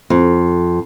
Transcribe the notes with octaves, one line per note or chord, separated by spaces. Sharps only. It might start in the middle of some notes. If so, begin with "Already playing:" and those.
F2